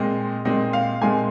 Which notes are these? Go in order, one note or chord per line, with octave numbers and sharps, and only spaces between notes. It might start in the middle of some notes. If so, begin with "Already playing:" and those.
Already playing: A#2 G#3 C4 D#5
A#2 G#3 C4 D#5
F5
A#2 G#3 C4 G#5